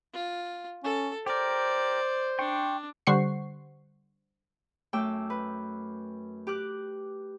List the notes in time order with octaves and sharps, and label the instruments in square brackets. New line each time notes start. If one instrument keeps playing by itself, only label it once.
[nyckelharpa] F4
[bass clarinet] C#4 [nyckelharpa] A4
[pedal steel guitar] G4 A#4 [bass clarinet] C5 [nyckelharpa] D5
[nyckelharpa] D4 [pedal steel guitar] G5 C6 C#6
[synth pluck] D3 G3 C5 F#5 C#6 C7
[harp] F#2 A3 G5 D6 E6
B4
G4 D6 F#6